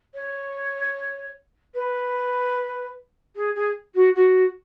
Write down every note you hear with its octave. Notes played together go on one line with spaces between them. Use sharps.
C#5
B4
G#4
G#4
F#4
F#4